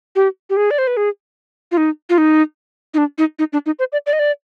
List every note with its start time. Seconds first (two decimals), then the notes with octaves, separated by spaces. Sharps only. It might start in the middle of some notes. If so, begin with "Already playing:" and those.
0.16 G4
0.50 G4
0.57 G#4
0.71 D5
0.78 C5
0.87 B4
0.97 G#4
1.72 F4
1.77 D#4
2.10 F4
2.18 D#4
2.94 D#4
2.98 D4
3.18 D#4
3.39 D#4
3.53 D4
3.66 D#4
3.79 C5
3.92 D5
4.07 D5
4.13 D#5
4.19 D5